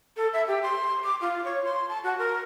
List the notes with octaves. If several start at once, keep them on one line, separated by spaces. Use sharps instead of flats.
A4
E5
G4
C6
D6
F4
C#5
C6
A5
F#4
A#4